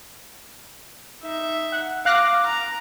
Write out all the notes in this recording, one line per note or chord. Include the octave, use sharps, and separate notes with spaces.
D#4 E5
F#5
F5 D6 F#6 A#6
A#5